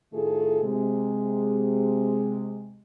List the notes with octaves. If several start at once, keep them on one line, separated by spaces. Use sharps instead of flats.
A2 D#3 A3 F4 G#4 A4
C3 G#3